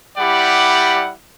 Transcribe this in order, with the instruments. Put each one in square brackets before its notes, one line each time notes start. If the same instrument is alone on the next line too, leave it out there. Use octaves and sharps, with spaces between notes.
[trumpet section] G3 E4 G4 D5 F#5 B5